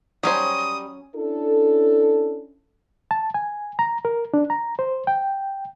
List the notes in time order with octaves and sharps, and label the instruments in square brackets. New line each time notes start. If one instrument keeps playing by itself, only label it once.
[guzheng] F#3 C#4 [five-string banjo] G3 C5 [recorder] D#6
[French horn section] C#4 D4 E4 A4
[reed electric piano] A5
G#5
A#5
A#4
D4
A#5
C5
G5